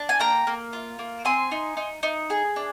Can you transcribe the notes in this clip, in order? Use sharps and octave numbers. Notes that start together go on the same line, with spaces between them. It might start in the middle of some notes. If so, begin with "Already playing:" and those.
Already playing: D4
G#5
A#3 G5 A#5
A#3
F4
A#3
C4 G#5 C6
D#4
D#4
D#4
G#4
D4